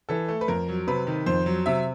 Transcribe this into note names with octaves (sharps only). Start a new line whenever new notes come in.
E3 A4
A3
B4
F2 A#4
F#3
C3 B4
D#3
F2 C5
F#3
C3 E5